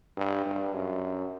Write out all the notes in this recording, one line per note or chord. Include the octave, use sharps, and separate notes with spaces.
G2
G2
F#2